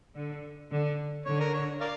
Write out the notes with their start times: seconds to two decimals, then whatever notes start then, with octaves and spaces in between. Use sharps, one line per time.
0.15 D3
0.71 D3
1.26 D3 C#5
1.40 A#4
1.54 C#5
1.81 A#4 D5 F5